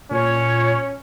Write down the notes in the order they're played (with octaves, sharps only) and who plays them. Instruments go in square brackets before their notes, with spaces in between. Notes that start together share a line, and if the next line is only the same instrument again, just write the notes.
[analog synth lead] A#2 [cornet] C#4 [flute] C#5